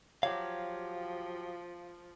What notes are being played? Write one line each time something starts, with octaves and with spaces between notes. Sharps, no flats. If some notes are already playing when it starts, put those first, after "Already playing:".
F3 F#3 G4 F5